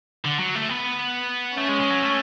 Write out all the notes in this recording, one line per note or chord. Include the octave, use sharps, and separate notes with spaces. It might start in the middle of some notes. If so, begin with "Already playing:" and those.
D3
F#3
A3
B3
A3 C#4
G#3
G#3
F#3
A3